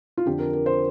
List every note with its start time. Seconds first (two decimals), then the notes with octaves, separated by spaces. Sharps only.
0.17 F4
0.26 F2 D3 F3 G4
0.39 A#4
0.53 A#4
0.66 C5